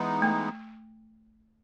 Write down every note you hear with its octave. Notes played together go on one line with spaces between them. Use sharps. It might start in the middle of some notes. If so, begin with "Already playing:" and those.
Already playing: E3 G#3 B3 D#4
A3